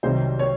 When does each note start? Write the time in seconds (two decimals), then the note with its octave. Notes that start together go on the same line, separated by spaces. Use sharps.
0.03 C2 C3 D#3 F#3 C5
0.39 C#5